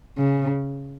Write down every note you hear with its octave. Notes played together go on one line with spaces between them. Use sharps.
C#3